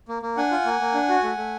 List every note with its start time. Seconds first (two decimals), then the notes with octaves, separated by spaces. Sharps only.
0.08 A#3
0.22 A#3
0.37 D4 F#5 G#5
0.51 F4
0.66 A#3
0.80 A#3
0.94 D4
1.09 F#4
1.23 A3
1.37 A3